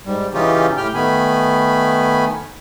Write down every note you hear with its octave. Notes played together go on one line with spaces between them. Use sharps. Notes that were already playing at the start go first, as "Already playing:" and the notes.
G#2 G3
C#3 E3 C#4 D#4 F4 G4
A2 G4 G5 F6
D#3 A3 B3 G#5 B5